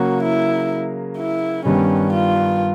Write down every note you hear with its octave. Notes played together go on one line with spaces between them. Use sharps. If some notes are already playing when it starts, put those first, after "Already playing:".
Already playing: C#3 F#3 A#3 F#4
E4
E4
G2 D#3 G3 B3 C#4
F4